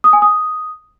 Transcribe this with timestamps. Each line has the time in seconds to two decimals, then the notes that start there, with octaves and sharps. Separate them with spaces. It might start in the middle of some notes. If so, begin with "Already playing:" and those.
0.04 D#6
0.13 G#5
0.22 D#6